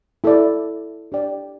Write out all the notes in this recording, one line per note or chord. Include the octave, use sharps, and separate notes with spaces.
E4 A4 D5
D4 G4 D5 G5